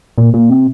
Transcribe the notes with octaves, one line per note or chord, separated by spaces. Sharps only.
A#2
A#2
C3